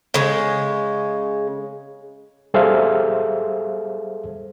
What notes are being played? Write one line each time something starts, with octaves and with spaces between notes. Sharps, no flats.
C#3 G#3
G3 G#4 A4 C5 E5 F5